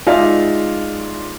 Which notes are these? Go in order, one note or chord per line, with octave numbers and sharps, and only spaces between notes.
G#3 D#4 F4 D5 E5 F5